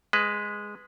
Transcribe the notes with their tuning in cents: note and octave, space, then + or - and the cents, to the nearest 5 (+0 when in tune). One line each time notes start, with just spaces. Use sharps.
G#3 -5 B4 +10